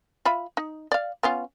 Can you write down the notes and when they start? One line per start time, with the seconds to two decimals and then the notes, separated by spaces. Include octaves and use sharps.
0.25 F4 E5 B5
0.57 D#4
0.92 D5 F5
1.23 B3 C#4 F4